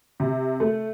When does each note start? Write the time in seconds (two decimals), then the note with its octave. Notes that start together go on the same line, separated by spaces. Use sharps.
0.20 C3
0.60 A3